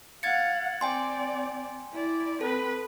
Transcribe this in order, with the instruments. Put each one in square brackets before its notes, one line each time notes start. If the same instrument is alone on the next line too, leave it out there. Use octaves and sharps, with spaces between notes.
[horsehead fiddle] F5 F#5 [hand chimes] G#6 A6 C#7
[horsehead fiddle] C4 D5 [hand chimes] G5 G#5 C6
[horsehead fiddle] E4 D5
[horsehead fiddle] C4 B4 [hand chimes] A4